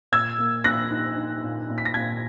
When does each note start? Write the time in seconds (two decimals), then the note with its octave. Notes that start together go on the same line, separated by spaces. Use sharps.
0.12 A#2 E6 G#6
0.38 A#3
0.64 A#2 F#6 A#6
0.90 D#4
1.17 D#4
1.44 A#2
1.70 A#2
1.78 B6
1.85 A#6
1.94 A#2 G#6 B6